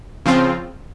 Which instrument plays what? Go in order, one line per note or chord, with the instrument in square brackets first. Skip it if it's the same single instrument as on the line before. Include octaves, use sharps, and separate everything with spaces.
[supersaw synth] C#3 F3 C4 F4